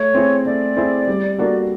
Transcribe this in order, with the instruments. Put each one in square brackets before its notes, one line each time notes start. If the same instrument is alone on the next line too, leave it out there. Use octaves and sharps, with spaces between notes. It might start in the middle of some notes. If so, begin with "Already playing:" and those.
Already playing: [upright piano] A3 [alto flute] C#5
[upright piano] C4 E4 G#4
[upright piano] A3 [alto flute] D5
[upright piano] C4 E4 G#4
G3
A#3 D4 F#4 A4